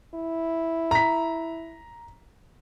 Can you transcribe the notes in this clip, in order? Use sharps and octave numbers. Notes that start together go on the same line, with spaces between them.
E4
A#5 B6